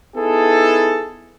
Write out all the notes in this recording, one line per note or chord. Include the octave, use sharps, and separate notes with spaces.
B3 D#4 E4 G#4 A4